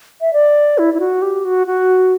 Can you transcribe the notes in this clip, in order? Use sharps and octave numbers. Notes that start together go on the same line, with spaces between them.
E5
D5
E4
E4
F#4
G4
F#4
F#4